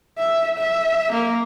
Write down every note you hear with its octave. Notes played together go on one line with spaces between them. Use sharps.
E5
E5
A#3